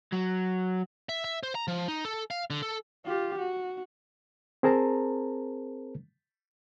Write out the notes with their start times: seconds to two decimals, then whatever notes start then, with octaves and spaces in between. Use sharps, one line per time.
0.13 F#3
1.09 E5
1.24 E5
1.43 C5
1.55 A#5
1.68 F3
1.88 D#4
2.05 A4
2.31 F5
2.50 D3
2.62 A4
3.05 F4 G4
3.38 F#4
4.63 C4 G#4 A#4 C5 A5 A#5